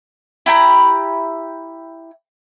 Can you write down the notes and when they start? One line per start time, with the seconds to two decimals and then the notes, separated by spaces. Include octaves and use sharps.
0.46 E4 G4 A#5 B5